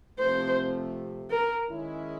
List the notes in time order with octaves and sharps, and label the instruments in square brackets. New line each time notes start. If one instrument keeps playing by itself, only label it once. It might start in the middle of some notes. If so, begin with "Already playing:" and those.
[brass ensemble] C3 F3 A3 [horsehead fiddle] C5
[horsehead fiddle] A#4
[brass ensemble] D#3 G#3 C#4 E4